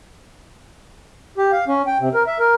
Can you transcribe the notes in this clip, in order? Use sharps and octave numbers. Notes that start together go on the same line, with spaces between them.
G4
F5
C#4
G5
C3
A#4
E5
A#4